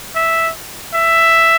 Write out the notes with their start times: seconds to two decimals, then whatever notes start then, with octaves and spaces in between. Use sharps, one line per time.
0.15 E5
0.94 E5